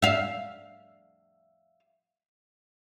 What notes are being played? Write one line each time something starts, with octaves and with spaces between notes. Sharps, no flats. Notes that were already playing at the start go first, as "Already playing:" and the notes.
E5 F5